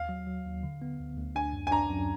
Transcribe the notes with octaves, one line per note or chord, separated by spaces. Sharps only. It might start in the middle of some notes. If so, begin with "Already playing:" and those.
Already playing: D#2 F5
F#3
F#3
D#2
D3
B3
D2
D2
D4 G#5
F#2
G#5
D4 A#5
F#2